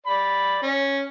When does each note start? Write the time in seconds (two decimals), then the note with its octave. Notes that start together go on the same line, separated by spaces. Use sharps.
0.06 D5 B5
0.62 C#4